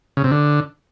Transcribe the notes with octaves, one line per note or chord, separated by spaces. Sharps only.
C#3
C3
D3